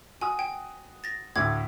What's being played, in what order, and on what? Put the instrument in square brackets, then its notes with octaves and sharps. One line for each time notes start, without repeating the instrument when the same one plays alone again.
[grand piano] F#4 D#6 [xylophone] G#5
[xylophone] G5
A6 A#6
[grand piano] D2 A2 [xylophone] D6 G#6